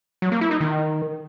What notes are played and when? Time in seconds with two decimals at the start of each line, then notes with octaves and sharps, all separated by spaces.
0.22 F#3
0.32 A#3
0.41 E4
0.51 D#4
0.60 D#3